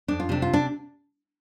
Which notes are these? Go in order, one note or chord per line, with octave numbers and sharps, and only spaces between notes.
F2 D4
F4
C3 D4
F4
D4